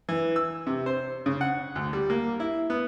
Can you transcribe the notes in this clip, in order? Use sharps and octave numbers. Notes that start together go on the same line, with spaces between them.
E3
E6
C3
C5
C#3
F#5
D2
G3
A#3
E4
B3